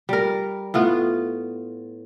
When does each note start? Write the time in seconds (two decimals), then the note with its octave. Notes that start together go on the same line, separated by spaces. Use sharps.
0.09 G3 A#4
0.74 A2 B3 F4